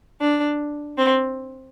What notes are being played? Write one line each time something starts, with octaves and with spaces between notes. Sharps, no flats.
D4
C4